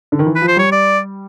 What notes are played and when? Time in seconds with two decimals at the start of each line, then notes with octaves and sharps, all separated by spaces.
0.12 D3
0.19 D#3
0.26 E3
0.36 B4
0.42 F3
0.48 C5
0.57 G3 C#5
0.72 D5